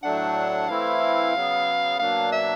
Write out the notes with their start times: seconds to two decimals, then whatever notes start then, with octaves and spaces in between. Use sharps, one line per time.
0.03 A2 F#3 A3 D4 F#5
0.68 E3 A3 C4 E4 F5
1.34 C#3 F#3 B3
1.99 B2 F#3 A#3 D4 F5
2.32 E5